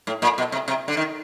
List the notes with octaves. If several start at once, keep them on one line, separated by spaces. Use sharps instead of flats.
A2
A#2
B2
C3
C3
D3
D#3